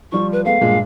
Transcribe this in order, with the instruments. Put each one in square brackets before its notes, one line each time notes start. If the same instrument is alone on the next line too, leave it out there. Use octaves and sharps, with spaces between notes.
[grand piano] F3 G3 F4 [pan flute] C#6
[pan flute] B4
[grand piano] G#3 A3 B3 [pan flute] F5
[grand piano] G2 A#2 G#3